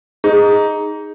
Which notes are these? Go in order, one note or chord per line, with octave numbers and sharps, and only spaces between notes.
D#4 G#4